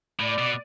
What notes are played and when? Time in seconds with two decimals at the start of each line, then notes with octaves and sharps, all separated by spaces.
0.20 A2 D5
0.38 B2